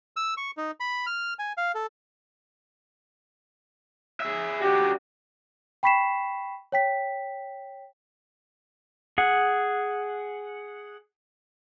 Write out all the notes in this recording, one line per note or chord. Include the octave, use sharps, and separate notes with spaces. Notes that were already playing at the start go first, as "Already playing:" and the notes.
E6
C#6
D#4
B5
F6
G#5
F5
A4
G#4 E5
D4 F#4 G4
G5 B5 C#6 B6 C7 E7
C#5 G5 B6
G#4 F#5